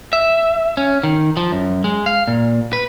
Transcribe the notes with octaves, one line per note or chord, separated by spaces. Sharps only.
E5
C#4
D#3
F3
F#2
G#3
F5
A#2
B4